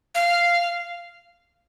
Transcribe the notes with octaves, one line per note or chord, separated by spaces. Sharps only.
F5